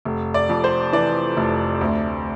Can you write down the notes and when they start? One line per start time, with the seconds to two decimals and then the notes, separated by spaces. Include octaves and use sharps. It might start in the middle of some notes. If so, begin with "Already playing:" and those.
0.05 F1
0.34 D5
0.49 F2
0.64 C5
0.93 E3 D5
1.37 F1
1.81 D2